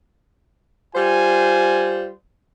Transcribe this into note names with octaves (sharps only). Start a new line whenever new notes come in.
G3 F4 C5 G#5